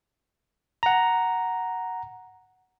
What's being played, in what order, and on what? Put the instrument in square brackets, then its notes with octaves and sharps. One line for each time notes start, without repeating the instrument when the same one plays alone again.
[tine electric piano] F#5 A#5